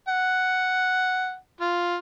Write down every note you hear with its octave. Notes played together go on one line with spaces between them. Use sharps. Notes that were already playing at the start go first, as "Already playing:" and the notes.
F#5
F4